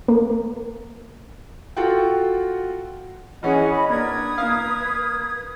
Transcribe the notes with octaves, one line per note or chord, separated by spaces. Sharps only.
A#3
F4 F#4 A4 F#5 G5
E3 C#4 G#4 D#5 F#5
D#5 B5
A#3 D4 B4 D#6 G#6
A#3 F5